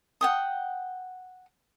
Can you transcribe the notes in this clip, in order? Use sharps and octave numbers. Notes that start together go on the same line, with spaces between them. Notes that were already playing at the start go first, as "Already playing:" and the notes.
F#5 G5 D#6